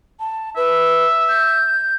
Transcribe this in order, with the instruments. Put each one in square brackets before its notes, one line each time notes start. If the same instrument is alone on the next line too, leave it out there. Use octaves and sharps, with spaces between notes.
[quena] A5
[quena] B4 [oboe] E5
[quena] G6